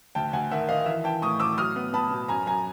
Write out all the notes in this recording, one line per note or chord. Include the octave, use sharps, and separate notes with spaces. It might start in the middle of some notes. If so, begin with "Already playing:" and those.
D2 G5 A5
D2 F#5 G#5
D#3 E5 F#5
D#3 D#5 F5
E3 E5
E3 G5 A5
A2 C#6 D#6
A2 D6 E6
F#3 D#6 F6
B3
B3 A5 B5
B2
F#2 G#5 A#5
F#2 G#5 A#5